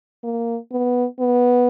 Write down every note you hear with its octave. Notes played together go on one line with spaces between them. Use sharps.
A#3
B3
B3